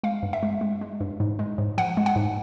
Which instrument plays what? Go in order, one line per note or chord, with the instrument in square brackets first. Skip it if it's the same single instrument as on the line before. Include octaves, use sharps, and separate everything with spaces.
[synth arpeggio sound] G#3 F5
G2
E5
G#3
G#3
G#3
G2
G#2
G#3
G#2
F3 F#5
G#3
F#5
G#2